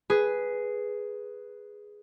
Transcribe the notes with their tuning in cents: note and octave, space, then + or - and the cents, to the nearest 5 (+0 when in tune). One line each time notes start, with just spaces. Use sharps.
G#4 +0 B4 +0